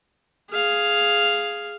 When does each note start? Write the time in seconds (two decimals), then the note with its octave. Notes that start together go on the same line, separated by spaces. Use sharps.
0.51 G#4 F5